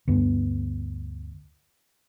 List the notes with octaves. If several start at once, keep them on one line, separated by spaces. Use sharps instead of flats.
D2 G2 B3